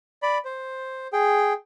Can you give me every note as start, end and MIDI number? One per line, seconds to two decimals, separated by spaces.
0.22 0.38 74
0.22 0.38 83
0.45 1.07 72
1.13 1.53 68
1.13 1.53 79